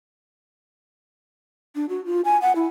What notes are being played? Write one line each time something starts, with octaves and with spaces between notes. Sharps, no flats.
D4
F#4
F4
G#5
F#5
E4